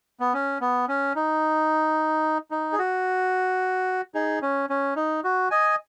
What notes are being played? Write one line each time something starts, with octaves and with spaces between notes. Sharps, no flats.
B3
C#4
B3
C#4
D#4
D#4
G#4
F#4
D#4 G#4
C#4
C#4
D#4
F#4
D#5 G#5